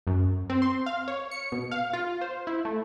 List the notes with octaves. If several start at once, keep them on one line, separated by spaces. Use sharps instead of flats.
F#2
C4
C6
F5
C#5
C#7
B2
F5
F4
C5
E4
A3